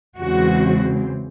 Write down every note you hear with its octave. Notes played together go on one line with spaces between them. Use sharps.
E2 C#3 E3 G#3 C4 F#4